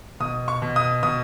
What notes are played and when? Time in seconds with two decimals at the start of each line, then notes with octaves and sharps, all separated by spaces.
0.20 B2 D#6
0.48 C#6
0.62 B2
0.76 D#6
1.03 B2 D#6